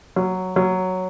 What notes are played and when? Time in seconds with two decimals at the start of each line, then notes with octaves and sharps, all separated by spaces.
0.16 F#3
0.56 F#3